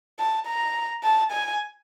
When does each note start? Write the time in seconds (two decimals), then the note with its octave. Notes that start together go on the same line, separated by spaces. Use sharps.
0.19 A5
0.47 A#5
1.04 A5
1.32 G#5